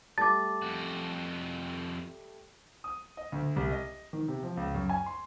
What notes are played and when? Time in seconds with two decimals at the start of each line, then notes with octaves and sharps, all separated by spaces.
0.18 G3 A3 A5 D6 A6
0.62 F2 F#4
2.84 D#6
3.17 D#5
3.32 D2
3.56 C2
3.71 D#5
4.13 D#3
4.28 C3
4.43 F3
4.57 C#2
4.75 F#2
4.89 G#5
5.06 C6